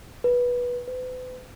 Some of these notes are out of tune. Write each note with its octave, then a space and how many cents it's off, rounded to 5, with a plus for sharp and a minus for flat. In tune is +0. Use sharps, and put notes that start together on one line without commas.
B4 -15
B4 +40